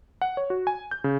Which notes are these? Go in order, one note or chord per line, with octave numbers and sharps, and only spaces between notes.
F#5
C#5
F#4
G#5
G6
C#3